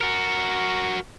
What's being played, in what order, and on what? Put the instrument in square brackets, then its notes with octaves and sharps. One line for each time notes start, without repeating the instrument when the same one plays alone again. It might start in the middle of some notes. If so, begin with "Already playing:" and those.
[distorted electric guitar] F#4 A#4